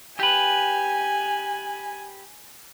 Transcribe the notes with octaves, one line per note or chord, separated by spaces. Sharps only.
G4 B4 G#5